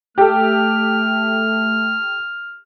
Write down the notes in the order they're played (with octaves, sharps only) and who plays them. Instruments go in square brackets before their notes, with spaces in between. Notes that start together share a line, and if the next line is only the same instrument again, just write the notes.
[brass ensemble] A3 [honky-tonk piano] G4 A4 [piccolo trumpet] F6